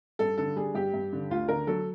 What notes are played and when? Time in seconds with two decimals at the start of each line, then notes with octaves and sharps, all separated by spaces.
0.19 G2 A4
0.38 D3 A4
0.56 G3 G#4
0.74 G2 G4
0.94 G2
1.13 D3
1.30 D2 F4
1.48 D3 A#4
1.67 F#3 A4